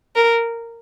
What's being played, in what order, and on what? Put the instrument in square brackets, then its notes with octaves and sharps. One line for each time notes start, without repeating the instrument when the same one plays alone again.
[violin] A#4